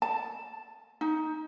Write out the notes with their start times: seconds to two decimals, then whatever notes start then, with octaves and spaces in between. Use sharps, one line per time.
0.02 A5
1.01 D#4